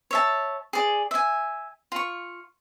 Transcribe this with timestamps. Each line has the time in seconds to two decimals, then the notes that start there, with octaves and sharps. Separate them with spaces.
0.11 C#5 E5 A5
0.73 G#4 D5
1.11 E5 G#5
1.92 F4 C#6